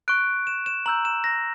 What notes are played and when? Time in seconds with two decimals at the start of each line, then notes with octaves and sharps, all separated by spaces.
0.08 C#6 F#6 D7
0.47 E7
0.66 E7
0.86 A#5 E6 G6 F#7
1.05 E7
1.24 A#6